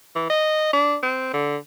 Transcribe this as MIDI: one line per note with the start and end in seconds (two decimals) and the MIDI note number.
0.15 0.30 52
0.30 0.72 75
0.73 0.97 62
1.03 1.33 60
1.34 1.57 50